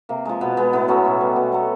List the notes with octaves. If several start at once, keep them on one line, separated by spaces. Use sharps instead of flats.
C3 A#3
F3 G#3
B2 B3
G#3 B3
A2 B3
F#3 A3 C#4
B2
G3
B2
F#3 A3